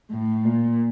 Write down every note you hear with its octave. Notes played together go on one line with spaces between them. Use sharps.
A2
A#2